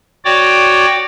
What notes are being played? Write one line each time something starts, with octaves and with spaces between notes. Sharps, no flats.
F#4 C#5 D5 G5 D6